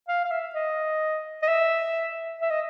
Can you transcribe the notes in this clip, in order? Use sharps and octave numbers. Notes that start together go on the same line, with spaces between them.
F5
F5
E5
D#5
D#5
E5
E5
D#5